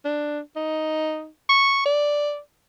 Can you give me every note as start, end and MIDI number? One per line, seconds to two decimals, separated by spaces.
0.05 0.40 62
0.56 1.28 63
1.49 1.81 85
1.86 2.39 74